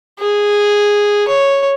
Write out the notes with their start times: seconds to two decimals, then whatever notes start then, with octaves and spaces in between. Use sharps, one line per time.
0.19 G#4
1.28 C#5